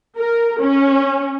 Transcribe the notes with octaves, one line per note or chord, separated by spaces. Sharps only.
A#4
C#4